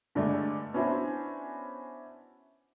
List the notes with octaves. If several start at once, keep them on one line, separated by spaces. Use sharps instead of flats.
G2 D3 G#3 A3 D5
B3 C#4 D4 E4 F#4 C5